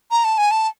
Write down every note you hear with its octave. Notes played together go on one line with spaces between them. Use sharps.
A#5
A5
G#5
A5